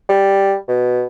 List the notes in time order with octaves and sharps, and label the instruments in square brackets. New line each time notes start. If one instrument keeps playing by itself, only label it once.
[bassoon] G3
B2